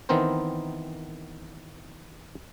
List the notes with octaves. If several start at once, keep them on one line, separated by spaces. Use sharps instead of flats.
D#3 E3 B3 C4 A#4 C5